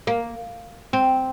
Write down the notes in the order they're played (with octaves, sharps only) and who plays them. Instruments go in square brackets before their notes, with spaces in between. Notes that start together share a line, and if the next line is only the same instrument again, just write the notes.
[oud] A#3
C4